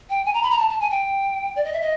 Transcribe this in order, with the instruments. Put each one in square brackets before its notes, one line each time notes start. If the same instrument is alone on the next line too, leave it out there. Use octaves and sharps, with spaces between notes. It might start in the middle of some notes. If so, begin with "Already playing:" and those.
[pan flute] G5
G#5
A#5
B5
A#5
A5
A5
G#5
G5
D5
D#5
E5
D#5